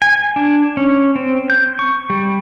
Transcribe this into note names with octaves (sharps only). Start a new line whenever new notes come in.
G#5
D4
C#4
C4
G6
C#6
G3